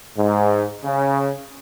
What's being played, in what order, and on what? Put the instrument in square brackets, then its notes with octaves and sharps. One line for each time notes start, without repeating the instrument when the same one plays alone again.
[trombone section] G#2
C#3